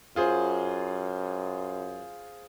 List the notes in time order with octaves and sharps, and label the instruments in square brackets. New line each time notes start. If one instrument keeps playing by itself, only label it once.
[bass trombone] F#2 [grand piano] F4 G#4 C5